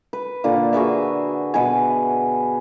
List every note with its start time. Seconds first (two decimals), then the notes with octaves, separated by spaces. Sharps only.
0.13 B4
0.44 A#2 D3 A#3
0.73 F#4 G#4 B4 E5
1.54 B2 B4 F#5 G#5